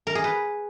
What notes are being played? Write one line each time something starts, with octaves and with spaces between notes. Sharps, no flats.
A#4
G#4
B4